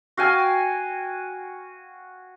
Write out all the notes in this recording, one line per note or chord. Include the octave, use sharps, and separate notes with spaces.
F#4 F5 G5 G#5